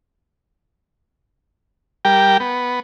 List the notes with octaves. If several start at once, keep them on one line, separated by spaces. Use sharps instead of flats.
G3 G4 A#4 G5
B3